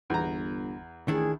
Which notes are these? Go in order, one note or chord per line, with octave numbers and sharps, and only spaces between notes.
G1 E2 A#5
A1 D#3 D4 E4 G#4